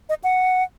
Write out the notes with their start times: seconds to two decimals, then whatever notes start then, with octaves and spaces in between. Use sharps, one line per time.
0.09 D#5
0.24 F#5